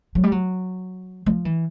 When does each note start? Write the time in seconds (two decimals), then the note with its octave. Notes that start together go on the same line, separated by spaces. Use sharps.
0.15 F#3
0.23 G3
0.32 F#3
1.26 F3
1.45 E3